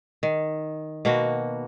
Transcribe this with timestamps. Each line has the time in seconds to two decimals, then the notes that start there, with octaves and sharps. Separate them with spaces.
0.23 D#3
1.05 B2 A#3 F#4